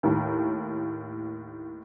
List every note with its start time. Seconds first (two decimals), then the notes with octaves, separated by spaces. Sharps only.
0.03 D#2 A2